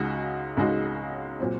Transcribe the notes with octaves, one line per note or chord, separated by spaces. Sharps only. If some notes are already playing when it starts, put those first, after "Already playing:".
Already playing: C#2 C#3 G#3 D#4 F#4
C#2 C#3 G#3 D#4 F#4
A#2 F#3 C4